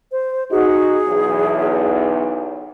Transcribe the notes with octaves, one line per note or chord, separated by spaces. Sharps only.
C5
D#4 F#4 G#4
B1 E2